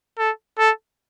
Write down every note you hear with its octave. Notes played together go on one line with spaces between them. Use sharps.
A4
A4